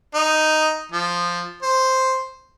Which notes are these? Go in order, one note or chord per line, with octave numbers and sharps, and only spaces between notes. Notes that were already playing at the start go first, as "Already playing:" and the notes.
D#4
F3
C5